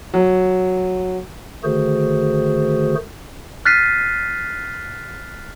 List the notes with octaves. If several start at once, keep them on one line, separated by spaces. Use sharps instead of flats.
F#3
D3 D#3 A3 F#4 G#4 C5
F6 F#6 A6 B6 C7 D#7